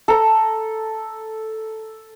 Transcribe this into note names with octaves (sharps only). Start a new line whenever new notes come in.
A4 A#5